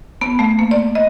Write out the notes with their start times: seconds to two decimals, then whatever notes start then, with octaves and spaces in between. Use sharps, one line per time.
0.21 B3
0.39 A3
0.59 A#3
0.71 D5
0.95 D#5